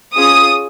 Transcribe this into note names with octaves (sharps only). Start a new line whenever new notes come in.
C#4 F4 G#4 D#6